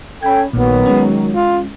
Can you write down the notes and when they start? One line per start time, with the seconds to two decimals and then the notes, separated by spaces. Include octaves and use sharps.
0.23 C#4 A4 G5 B5 G#6
0.53 A#1 A#2 D#3 F#3 B3
0.86 G#3 C#4
1.31 F4